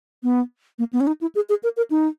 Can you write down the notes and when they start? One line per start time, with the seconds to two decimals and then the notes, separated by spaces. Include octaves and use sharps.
0.23 B3
0.79 A#3
0.93 B3
1.00 C#4
1.07 D#4
1.21 E4
1.35 G#4
1.49 G#4
1.63 A#4
1.77 A#4
1.91 D#4